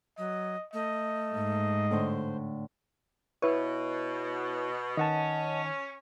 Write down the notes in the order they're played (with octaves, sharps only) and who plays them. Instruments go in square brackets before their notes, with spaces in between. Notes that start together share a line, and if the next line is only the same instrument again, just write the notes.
[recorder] F#3 [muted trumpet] D#5
[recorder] A3 [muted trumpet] D#5
[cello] G#2
[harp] A2 D3 [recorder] C5
[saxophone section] B2 [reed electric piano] E4 C#5 [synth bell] B4
[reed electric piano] D#3 [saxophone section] C#4 [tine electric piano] D#5 F#5 A5